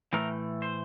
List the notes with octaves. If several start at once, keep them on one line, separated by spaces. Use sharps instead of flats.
A2 E3 A3 A#4
C5